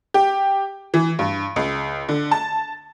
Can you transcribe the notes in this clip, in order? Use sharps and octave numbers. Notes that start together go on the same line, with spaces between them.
G4
E3
G2
C#2
D3
A5